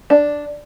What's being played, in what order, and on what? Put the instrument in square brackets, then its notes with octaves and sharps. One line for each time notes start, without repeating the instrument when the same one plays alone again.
[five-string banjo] D4